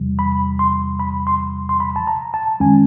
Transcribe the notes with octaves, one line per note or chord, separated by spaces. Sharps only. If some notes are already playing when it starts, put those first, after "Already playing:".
Already playing: E2 C3 E3 G3
B5
C6
B5
C6
C6
B5
A5
A#5
A5
F#2 D#3 G#3 C#4 G#5